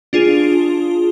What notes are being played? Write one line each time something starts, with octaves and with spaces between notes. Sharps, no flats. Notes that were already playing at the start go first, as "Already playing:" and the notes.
D4 F4 G#4